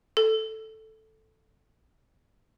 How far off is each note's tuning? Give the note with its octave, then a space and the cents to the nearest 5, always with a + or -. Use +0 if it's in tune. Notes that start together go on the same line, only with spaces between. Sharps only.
A4 +0